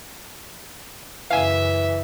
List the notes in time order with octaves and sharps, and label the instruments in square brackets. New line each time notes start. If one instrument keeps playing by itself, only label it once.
[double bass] F#2 C#3 [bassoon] E3 [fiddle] E5 [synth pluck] F5 G#5